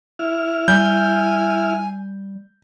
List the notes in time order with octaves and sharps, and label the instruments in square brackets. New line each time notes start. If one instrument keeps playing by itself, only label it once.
[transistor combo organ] E4 F6
[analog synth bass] G3 [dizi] G#5 [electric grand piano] G6